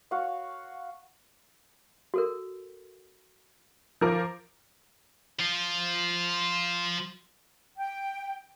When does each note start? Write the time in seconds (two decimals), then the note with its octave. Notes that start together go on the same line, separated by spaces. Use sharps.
0.11 F#4 C#5 F5 F#5
2.14 F#4 A4 A#4
4.01 F3 A#4 D6
5.40 F3 F4
7.77 G5